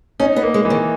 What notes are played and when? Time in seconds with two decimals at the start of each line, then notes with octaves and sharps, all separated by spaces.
0.20 C#4 D#4
0.36 B3
0.43 A#3
0.54 G#3
0.65 E3
0.70 D#3